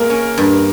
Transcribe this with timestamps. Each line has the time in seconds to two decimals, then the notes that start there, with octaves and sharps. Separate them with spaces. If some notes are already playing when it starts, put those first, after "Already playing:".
Already playing: G#3 A#3 A#4
0.10 C#4
0.38 G2